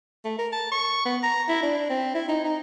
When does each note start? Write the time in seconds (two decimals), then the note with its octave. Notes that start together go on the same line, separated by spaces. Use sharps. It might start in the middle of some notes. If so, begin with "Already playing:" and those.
0.25 A3
0.38 A#4
0.52 A5
0.71 C#6
1.05 B3
1.23 A#5
1.49 E4
1.63 D4
1.89 C4
2.14 E4
2.28 D#4
2.45 D#4